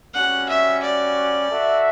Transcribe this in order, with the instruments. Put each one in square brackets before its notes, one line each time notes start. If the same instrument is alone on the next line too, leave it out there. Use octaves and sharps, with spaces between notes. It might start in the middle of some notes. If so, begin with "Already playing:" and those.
[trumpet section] G3 C#4 F#4 [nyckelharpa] F#5
[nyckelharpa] E5
D5
[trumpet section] F#4 A4 E5